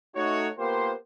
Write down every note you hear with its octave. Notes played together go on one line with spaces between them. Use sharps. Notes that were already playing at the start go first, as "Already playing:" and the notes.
A3 D#4 F#4 C#5
A#3 B3 F4 G4 A#4 C5